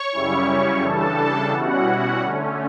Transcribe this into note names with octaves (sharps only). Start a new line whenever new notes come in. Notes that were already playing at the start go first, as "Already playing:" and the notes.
Already playing: C#5 C#6
F#2 C#3 G3 C#4 E4
C#3 E3 G3 D4 A4 A5
B2 G3 C#4 E4 F#4 F#5
F#4 F#5
D3 A3 C#4